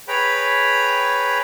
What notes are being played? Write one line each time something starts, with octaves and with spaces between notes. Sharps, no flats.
G#4 B4 C#5 G5 A#5 B5